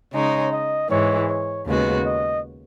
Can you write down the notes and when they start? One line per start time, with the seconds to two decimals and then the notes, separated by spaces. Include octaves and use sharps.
0.13 C#3 G#3 D#4 C#5
0.52 D#5
0.90 G#2 E3 G#3 C#5
1.28 C#5
1.66 D#2 C#3 G#3 B3 F#4
2.05 D#5